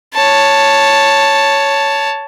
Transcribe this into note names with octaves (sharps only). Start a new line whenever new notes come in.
C#5 A5